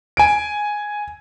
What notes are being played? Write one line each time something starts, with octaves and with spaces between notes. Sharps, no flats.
G#5 D7